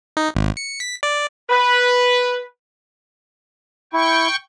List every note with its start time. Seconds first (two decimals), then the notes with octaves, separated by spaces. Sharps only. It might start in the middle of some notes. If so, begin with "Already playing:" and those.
0.17 D#4
0.35 G#1
0.57 C#7
0.80 B6
1.03 D5
1.50 B4
3.93 E4 G5 C#6